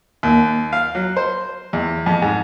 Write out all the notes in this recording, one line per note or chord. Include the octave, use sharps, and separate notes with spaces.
D#2
F5
F#3
C5
E2
F2
G#2